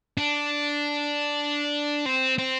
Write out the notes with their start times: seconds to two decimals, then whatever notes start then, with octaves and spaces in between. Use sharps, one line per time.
0.18 D4
2.06 C4
2.38 C4